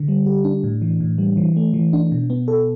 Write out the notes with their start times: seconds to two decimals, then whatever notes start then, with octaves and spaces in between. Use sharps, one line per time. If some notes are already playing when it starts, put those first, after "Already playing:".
Already playing: D3
0.08 G3
0.26 G4
0.44 D4
0.64 A2
0.82 E3
1.00 A2
1.18 G3
1.37 E3
1.56 A3
1.74 E3
1.93 D4
2.12 B2
2.30 B3
2.48 A4